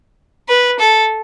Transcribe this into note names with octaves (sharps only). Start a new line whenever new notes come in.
B4
A4